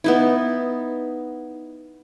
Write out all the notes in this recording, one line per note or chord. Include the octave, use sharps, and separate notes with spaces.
B3 D#4 E4